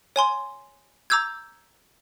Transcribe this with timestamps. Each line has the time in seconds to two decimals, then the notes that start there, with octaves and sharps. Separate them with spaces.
0.16 C#5 G#5 C6
1.10 A#5 D6 E6 G6 G#6